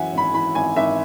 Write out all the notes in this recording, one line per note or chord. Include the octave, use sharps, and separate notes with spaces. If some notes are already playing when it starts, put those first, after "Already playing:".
Already playing: F#2 E3 E5 F#5 G#5
G#1 B5
E3 B5
G#1 G#5
G#1 E5